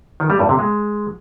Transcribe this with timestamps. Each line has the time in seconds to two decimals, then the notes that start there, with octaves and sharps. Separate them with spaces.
0.20 D#3
0.30 G3
0.39 G2
0.49 C3
0.59 G#3